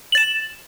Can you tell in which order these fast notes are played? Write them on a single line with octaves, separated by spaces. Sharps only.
F#7 A6 E7